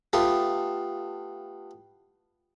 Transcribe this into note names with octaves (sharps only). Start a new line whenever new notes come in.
A3 B3 F4 G4 A4